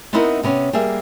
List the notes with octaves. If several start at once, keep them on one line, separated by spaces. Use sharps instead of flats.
B3 C4 D#4 E4 A#4 F#5
C3 B3 C#4
G3 A#3 G#4 E5